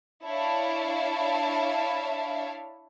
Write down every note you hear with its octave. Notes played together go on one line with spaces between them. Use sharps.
D4 E4 C#5 E5 F5 A5